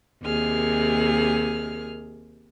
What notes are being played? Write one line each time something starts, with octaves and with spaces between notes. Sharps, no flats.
D#2 C3 G#4 F6